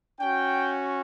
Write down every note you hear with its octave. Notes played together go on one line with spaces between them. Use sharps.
C#4 F#4 G5